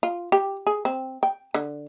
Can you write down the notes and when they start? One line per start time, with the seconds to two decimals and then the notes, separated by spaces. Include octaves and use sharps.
0.03 F4
0.32 G4
0.67 G#4
0.85 C4
1.23 G5
1.54 D3